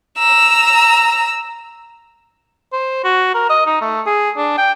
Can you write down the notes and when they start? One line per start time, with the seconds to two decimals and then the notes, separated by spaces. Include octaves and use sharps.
0.18 A#5 E6
2.72 C5
3.04 F#4
3.34 A#4
3.49 D#5
3.66 D#4
3.81 A3
4.06 G#4
4.37 D4
4.58 G5